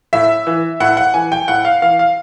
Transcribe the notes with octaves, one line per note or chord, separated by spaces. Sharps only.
A2 E5
E3
A2 F#5
F#5
E3 G#5
G5
A2 F#5
F5
E3 F5
F5